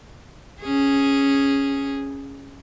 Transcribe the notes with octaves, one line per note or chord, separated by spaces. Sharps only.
C#4 G#4